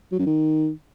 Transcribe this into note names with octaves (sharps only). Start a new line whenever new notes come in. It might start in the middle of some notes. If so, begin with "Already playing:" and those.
F#3
F#2
D#3